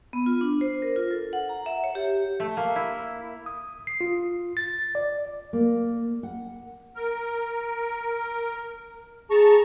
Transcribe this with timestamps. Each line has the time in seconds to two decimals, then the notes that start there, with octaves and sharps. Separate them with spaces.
0.13 B3
0.26 F4
0.41 D4
0.61 C5
0.82 A#4
0.96 F4
1.11 A4
1.33 F#5
1.49 A#5
1.66 E5
1.84 C#5
1.95 G4
2.40 A3
2.57 A#3
2.76 E4
3.46 D#6
3.87 C7
4.01 F4
4.57 A6
4.95 D5
5.53 A#3
6.23 F#5
6.96 A#4
9.30 G#4 A5 A#5 C#6